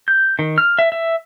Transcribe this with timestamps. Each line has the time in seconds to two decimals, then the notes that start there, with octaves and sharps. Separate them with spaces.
0.08 G6
0.39 D#3
0.58 F6
0.79 E5
0.92 E5